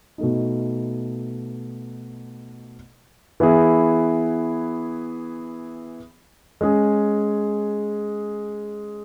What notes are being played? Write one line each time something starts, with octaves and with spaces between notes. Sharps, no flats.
B2 A3 D#4
E3 B3 E4 G#4
G#3 C#4 G#4